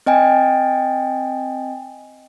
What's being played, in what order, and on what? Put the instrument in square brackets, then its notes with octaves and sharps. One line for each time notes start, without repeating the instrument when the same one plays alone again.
[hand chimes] C4 D#5 G5 G#5